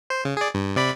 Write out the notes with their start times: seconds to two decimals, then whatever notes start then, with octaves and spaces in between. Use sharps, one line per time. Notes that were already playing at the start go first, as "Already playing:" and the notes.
0.10 C5
0.25 C#3
0.37 G#4 D5
0.54 G2
0.76 C3 D5 B5